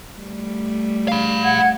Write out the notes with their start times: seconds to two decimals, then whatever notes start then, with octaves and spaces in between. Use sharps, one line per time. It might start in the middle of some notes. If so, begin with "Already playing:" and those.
0.19 G3 A3
1.08 F5 B5
1.44 F#5 G#6